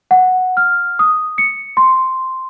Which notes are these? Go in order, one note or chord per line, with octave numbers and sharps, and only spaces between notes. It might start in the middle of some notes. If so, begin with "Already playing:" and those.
F#5
F6
D#6
C#7
C6